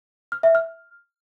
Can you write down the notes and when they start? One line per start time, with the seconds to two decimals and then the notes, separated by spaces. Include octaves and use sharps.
0.32 F6
0.43 E5
0.55 F6